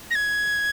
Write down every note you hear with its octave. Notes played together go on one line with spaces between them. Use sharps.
A#6
G#6